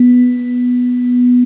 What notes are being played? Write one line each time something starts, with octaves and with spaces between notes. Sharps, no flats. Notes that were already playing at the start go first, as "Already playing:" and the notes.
Already playing: B3